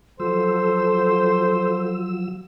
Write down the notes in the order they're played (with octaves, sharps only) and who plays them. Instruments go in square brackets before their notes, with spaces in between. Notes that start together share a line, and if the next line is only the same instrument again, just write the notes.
[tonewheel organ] F3 F#3 E6 [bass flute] A4 [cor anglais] C5